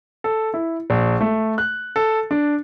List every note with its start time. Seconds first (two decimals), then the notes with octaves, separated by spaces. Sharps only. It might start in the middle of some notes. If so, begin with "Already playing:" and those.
0.24 A4
0.54 E4
0.90 A#1
1.21 A3
1.58 F#6
1.96 A4
2.31 D4